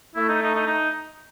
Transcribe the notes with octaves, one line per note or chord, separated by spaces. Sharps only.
A3 E4
D#4
D#4
D#4
D#4